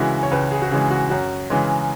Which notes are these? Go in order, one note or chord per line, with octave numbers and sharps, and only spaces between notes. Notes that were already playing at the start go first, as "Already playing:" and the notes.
Already playing: C#2 C#3 E3 G#3 E4 F#4
C#5
C#2 B4
G#4
F#4
C#3 E3 G#3 G#4
F#4
F#2 F#4
C#3 E3 G#3